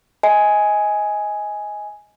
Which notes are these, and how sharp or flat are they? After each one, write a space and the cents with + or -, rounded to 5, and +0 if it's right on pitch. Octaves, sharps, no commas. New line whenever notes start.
D#5 +25 G#5 +5